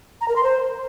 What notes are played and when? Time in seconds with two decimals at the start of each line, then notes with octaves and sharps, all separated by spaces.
0.21 A#5
0.28 A#4
0.36 C6
0.43 C5